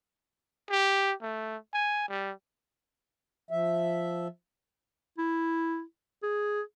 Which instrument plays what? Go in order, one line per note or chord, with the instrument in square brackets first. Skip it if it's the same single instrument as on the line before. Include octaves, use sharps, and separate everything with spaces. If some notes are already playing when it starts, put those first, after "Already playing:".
[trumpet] G4
A3
G#5
G3
[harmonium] F3 E5
[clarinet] E4
G#4